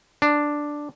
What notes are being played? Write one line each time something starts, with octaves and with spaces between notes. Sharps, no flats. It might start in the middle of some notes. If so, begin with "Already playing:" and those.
D4